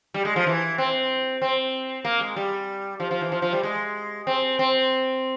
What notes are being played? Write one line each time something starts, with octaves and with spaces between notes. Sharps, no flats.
G3
G#3
F3
E3
C4
C4
A#3
G#3
G3
F3
F3
E3
F3
F3
G3
G#3
C4
C4